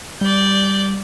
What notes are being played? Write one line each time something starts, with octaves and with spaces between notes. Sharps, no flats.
G3 D5 G6